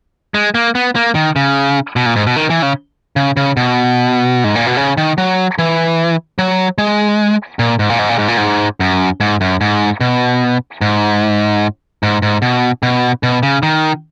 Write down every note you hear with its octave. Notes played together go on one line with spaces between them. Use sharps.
G#3
A#3
B3
A#3
D#3
C#3
B2
A#2
G#2
B2
D#3
E3
C#3
C#3
C#3
B2
G#2
A#2
B2
C#3
D#3
F#3
E3
F#3
G#3
A#2
G#2
A#2
G#2
A#2
G#2
A#2
G#2
F#2
G#2
F#2
G#2
B2
G#2
G#2
G#2
B2
B2
B2
C#3
D#3